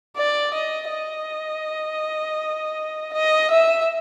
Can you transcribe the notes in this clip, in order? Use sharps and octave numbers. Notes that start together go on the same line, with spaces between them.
D5
D#5
D#5
D#5
E5